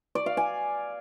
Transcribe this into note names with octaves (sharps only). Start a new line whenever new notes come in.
D5
F5
G#5